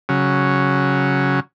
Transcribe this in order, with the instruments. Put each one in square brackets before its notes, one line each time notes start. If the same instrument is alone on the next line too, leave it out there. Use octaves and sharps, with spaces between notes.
[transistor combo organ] C#3 F#3